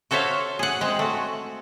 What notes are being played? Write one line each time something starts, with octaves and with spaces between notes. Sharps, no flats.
F#4 A4 C5 C#5 E5 F5
G#4 F#5
G#3 C4
A3 F#4